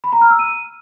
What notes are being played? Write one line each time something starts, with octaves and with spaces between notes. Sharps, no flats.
B5
A#5
F6
E6
D#7